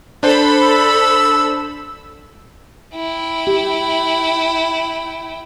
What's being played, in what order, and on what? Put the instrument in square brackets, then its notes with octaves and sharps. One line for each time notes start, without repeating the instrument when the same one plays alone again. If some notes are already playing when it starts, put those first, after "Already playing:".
[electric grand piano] D4 C5 [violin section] A4 B5
[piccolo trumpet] E6
[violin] E4 G5
[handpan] G4